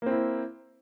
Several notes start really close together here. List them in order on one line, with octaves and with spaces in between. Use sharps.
A#3 C4 E4